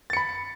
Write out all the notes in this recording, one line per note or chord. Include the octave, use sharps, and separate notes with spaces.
B5 A6 C#7